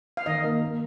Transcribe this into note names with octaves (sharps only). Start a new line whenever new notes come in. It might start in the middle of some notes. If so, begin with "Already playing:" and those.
F5
D#3 D#5
A#3
A#3